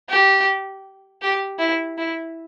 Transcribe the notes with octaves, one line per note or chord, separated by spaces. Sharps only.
G4
G4
E4
E4